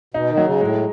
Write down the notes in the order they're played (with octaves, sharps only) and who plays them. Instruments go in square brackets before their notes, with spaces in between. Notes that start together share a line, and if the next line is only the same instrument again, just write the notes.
[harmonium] B2 [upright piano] D#4
[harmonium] D#3
[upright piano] F#3
[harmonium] C#3
[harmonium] A2 [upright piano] G#3